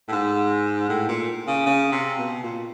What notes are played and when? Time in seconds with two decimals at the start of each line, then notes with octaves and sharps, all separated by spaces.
0.08 A2
0.12 G#2
0.89 A2
1.09 A#2
1.47 C#3
1.66 C#3
1.92 C3
2.18 B2
2.44 A#2